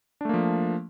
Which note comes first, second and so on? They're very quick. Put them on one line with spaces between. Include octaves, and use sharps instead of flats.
D4 A3 A#3 F3